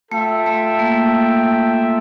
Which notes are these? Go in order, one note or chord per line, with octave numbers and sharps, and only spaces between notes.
A3 F4 A4 E5 G5
A3
A#3